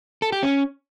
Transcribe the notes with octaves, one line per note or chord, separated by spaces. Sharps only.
A4
G4
C#4